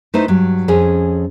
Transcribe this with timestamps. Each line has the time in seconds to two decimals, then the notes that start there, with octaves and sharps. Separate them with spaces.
0.14 A3 D#4 E4 B4 C5
0.28 G2 F#3
0.68 F2 C#4 G#4